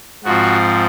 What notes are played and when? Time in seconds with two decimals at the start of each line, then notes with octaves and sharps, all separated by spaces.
0.24 G#2 F3 C4 F#4